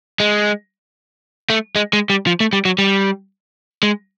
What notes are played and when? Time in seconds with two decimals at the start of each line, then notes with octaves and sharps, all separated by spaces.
0.20 G#3
1.50 A3
1.76 G#3
1.93 G#3
2.10 G3
2.27 F3
2.40 A3
2.53 G3
2.65 F#3
2.78 G3
3.83 G#3